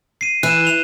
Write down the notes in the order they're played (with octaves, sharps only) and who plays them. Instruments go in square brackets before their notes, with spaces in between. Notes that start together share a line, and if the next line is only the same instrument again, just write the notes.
[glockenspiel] C7 D#7
[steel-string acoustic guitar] E3 [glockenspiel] F#6 D#7 E7
[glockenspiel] F7 G7